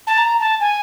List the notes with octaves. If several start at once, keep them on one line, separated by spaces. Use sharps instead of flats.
A5
A#5
A5
G#5